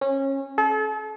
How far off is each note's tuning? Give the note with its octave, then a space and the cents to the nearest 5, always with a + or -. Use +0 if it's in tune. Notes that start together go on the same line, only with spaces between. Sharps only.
C#4 -25
A4 -40